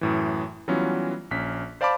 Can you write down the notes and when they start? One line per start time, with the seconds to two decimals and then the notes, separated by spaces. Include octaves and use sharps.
0.01 F#2 A2 E3
0.68 E3 F#3 G3 B3 C#4 F4
1.31 A#1 C#4 B6
1.81 C5 D5 F5 A5 B5 D6